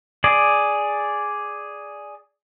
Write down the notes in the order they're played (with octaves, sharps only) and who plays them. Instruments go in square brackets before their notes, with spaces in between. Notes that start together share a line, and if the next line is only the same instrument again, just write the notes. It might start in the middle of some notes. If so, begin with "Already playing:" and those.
[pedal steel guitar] G#4 D5